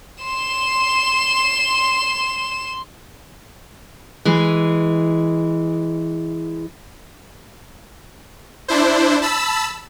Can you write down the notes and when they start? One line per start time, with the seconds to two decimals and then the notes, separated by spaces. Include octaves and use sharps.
0.23 C6 E7
4.25 E3 G#3
8.68 D4 E4 C5
9.22 A5 B5 E6